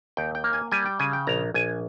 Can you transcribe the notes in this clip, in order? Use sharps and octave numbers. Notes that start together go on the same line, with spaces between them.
D#2 G5
G5
A#3
G#5
G3 G#5
G5
C#3 G#5
G5
A#1 A#5
A#1 G#5